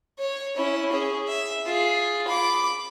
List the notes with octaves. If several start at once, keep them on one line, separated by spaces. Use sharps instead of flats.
C#5
C#4 E4
C#4 G#4
E5
F4 G#4
B5 D6